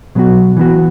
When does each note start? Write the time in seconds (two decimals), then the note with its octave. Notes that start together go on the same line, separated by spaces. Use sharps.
0.15 B2 F#3 B3 F#4
0.57 E3 B3 F#4